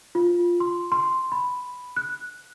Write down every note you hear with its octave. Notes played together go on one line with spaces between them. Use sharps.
F4
C6
C6
B5
F#6